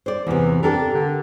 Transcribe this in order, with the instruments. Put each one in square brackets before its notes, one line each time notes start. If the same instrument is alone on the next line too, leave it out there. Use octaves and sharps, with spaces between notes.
[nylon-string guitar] C5 D5
[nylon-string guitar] E2 C3 [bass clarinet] E3
[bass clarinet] D4 [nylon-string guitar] G4 A4 A#4
[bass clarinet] D3